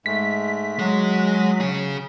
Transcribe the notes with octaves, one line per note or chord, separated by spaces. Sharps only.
G#2 G#3 A3 B6
F#3 G#3 F#4
C#3 G#4